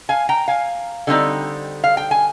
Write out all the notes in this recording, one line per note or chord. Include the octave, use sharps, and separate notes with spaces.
F5 G#5
G5 A#5
F5 G#5
D3 G3 C4 D#4
F5
G5
G#5